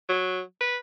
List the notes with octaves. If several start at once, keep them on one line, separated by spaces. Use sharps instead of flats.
F#3
B4